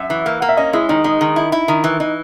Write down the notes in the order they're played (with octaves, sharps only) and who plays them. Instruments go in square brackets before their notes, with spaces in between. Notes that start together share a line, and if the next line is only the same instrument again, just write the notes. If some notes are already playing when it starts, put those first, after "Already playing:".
Already playing: [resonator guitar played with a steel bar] F#2 [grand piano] E5
[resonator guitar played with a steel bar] E3
A#3
[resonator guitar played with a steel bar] A#3 [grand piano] F#5
[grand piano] E5
[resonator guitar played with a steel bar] C#4 [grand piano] D#5
[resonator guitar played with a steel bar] G#3 [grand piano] E4
[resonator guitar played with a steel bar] D#3 [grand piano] D#4
[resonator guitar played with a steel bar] G#3 [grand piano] D#4
[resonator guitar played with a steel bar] D#3
E4
E4
D#3
E3
[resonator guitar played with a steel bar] E3 [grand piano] D#4